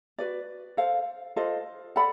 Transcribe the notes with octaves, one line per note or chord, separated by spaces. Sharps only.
F#4 B4 D5
A4 C5 F5
F4 A4 C5 D#5
A4 D5 F#5 B5